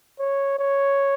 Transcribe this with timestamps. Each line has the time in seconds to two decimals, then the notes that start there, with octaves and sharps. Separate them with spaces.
0.19 C#5
0.59 C#5